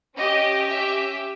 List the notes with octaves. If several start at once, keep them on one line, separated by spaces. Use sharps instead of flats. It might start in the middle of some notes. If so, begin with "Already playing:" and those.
C#4 G4 D#5
E5